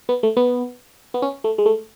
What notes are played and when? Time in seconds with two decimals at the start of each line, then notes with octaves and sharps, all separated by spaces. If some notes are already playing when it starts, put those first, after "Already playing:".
0.09 B3
0.23 A3
0.37 B3
1.14 B3
1.22 C#4
1.44 A3
1.58 G#3
1.66 A3